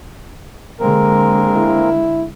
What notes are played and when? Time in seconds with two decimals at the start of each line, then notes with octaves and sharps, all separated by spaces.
0.80 D3 G#3 A#3 C4 A#4
1.56 E4